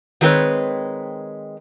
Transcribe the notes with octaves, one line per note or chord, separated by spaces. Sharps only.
D#3 F#3 G#3 C4 B4 C#5